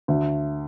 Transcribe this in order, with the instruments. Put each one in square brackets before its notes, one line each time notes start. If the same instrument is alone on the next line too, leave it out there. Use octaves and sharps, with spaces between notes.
[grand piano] D2